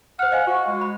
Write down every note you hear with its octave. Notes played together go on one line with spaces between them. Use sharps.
C5 F#5 F6
D#5 F5 G#5
F#4 C#6
G#3
B5